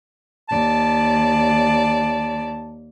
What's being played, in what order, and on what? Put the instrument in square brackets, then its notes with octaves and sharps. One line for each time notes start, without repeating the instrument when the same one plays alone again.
[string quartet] D#2 D5 [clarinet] A5